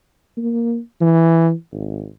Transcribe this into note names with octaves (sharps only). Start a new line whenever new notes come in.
A#3
E3
G#1